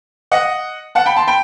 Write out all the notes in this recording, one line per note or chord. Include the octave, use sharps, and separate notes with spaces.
D#5 F#5
F#5 A5
G5 B5
A5 C6
G5 B5